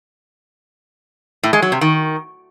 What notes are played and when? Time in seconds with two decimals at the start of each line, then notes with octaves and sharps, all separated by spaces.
1.43 A2
1.53 G#3
1.62 F#3
1.72 C3
1.81 D#3